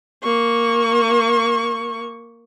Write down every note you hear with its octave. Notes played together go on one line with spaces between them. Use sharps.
A#3 C#6